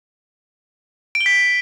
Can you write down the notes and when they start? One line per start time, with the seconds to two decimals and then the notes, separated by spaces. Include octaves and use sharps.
1.15 D7
1.21 G7
1.26 B6